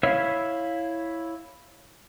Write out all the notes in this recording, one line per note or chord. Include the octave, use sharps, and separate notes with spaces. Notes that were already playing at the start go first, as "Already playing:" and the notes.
E4 C#5 E5 F5 E6